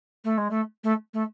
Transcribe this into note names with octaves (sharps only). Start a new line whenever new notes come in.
A3
G#3
A3
A3
A3